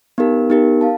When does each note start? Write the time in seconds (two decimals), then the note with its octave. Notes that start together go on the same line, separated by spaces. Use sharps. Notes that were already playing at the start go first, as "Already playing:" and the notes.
0.18 B3 D#4 G4 A#4
0.50 B3 D#4 G4 A#4
0.81 F5 A5